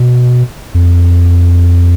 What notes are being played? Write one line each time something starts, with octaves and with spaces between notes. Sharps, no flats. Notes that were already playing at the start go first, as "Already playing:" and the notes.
Already playing: B2
F2